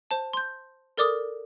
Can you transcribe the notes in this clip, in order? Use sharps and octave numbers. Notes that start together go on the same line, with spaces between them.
C5 A5
C6 G6
A4 A#4 D5 D6 D#6